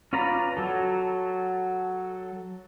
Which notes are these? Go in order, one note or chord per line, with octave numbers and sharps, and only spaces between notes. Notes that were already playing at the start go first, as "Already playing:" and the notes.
C#4 F4 B4 D5 A#5
F#3 A4